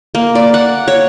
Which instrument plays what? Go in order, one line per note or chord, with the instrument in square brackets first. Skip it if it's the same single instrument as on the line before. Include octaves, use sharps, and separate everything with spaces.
[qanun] A#3
D5
F#5
C#5